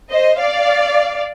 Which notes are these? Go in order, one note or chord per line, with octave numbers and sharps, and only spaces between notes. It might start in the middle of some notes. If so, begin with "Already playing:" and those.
C5 D#5
D5 F5